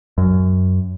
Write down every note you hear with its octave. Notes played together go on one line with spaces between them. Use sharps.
F#2